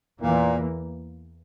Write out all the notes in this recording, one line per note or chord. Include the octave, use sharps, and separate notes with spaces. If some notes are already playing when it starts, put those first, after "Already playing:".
E2 A#2 E3 A#3